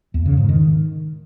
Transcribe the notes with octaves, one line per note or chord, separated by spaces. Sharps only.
E2
C#3
G#2
D#3